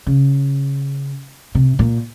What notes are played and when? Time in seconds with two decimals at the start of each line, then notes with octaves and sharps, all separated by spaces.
0.06 C#3
1.55 C3
1.79 A#2